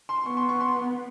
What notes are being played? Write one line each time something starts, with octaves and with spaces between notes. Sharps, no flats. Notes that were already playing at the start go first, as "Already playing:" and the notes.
C6
B3 C#6
C6
C#6
C6